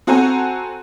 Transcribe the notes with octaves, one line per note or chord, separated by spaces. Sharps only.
C4 F#4 A4 C5 G#5 A#5